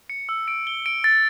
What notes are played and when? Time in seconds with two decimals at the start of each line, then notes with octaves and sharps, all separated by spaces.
0.10 C#7
0.29 E6
0.48 D7
0.67 G7
0.86 D7
1.04 A6